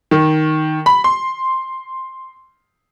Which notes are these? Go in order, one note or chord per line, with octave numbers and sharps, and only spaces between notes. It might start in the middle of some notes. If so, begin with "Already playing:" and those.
D#3
B5
C6